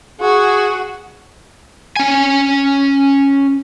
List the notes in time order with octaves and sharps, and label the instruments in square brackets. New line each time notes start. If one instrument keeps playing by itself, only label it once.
[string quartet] F#4 [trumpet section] G#4
[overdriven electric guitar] C#4 G#5